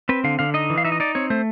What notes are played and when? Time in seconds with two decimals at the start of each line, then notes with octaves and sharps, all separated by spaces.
0.09 C4 B4
0.24 D3 F5
0.39 D3 F5
0.54 D#4 D#5
0.70 E3
0.78 F5
0.85 D#4 E5
0.92 D#5
1.00 D#4 D5
1.15 C4 C#5
1.30 A3 C5